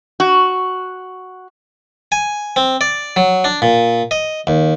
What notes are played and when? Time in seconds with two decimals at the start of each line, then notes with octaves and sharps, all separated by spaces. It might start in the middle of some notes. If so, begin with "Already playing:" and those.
0.20 F#4
2.12 G#5
2.56 C4
2.81 D5
3.16 F#3
3.44 D4
3.62 A#2
4.11 D#5
4.47 D#2